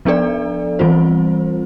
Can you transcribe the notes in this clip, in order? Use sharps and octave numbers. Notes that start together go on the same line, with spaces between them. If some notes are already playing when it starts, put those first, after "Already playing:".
F3 B3 D4 A4 D5
E3 G3 C4 F4 C5